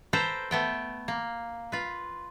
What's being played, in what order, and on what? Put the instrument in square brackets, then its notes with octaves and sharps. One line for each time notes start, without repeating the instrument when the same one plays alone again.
[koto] A4 B4 C5 G5 A#5
A3 B3 G5
A#3
F4 B4